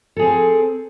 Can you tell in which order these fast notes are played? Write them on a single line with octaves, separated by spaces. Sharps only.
A4 G#4 C4